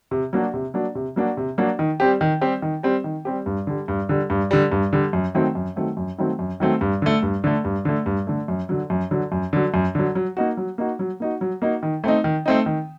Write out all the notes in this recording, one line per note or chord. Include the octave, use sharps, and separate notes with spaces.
C3
F#3 A#3 D4 F#4
C3
F#3 A#3 D4 F#4
C3
F#3 A#3 D4 F#4
C3
F#3 A#3 D4 F#4
D#3
G3 C4 G4
D#3
G3 C4 G4
D#3
G3 C4 G4
D#3
G3 C4 G4
G2
D3 G3
G2
D3 G3
G2
D3 G3
G2
D3 G3
F#2
D#3 F#3 A3 C4
F#2
D#3 F#3 A3 C4
F#2
D#3 F#3 A3 C4
F#2
D#3 F#3 A3 C4
G2
D3 A3
G2
D3 A3
G2
D3 A3
G2
D3 A3
F#2
D3 F#3
F#2
D3 F#3
F#2
D3 F#3
F#2
D3 F#3
F#3
A#3 D#4 F#4
F#3
A#3 D#4 F#4
F#3
A#3 D#4 F#4
F#3
A#3 D#4 F#4
D#3
A3 C4 D#4
D#3
A3 C4 D#4
D#3